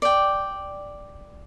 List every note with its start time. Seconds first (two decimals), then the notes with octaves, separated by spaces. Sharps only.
0.02 D5 G5